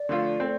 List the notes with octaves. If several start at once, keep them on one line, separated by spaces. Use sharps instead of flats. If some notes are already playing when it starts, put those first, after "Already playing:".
Already playing: D5
D3 F3 A3 F4
A3 C4